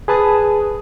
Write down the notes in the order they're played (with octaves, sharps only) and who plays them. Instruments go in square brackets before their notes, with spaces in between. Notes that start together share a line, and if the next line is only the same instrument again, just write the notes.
[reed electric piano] G#4 B4 A5 D#6